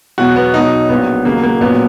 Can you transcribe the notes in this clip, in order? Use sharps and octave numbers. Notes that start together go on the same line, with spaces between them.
E2 B2 F#3 F#4
B3
B1 B2 F#3 D#4
A#1 A#2 F#3 B3
D#2 C#3 F#3 A#3
A#3
A#1 A#2 F#3 B3